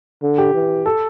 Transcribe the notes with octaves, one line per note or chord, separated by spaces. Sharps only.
D3
G4
E3
A4